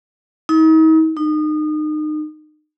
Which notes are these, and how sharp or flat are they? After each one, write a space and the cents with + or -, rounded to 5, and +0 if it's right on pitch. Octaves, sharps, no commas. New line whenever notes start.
D#4 +40
D#4 -30